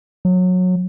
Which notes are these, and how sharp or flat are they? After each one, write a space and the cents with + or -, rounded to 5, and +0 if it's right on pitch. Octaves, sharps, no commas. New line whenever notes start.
F#3 -20